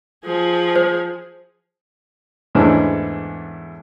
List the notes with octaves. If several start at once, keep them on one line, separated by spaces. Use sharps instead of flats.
F3 G#4
C5
E2 G#2 E3 A3 C#4 D4